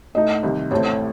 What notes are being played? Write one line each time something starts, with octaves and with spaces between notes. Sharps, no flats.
A2 A3 D#4 D#5
C2 C3 D#3
A1 A2 A3 C4 C#5